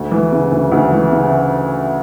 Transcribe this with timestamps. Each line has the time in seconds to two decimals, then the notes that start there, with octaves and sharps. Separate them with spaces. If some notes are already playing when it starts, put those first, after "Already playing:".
Already playing: D2
0.11 E3
0.32 C#3
0.51 D2
0.71 D2
0.92 E3
1.12 C#3